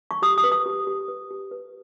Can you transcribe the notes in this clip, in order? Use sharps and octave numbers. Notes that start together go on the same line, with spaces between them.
C#6
G4 D#6
D#6
B4
D#6
G4
G4
B4
G4
B4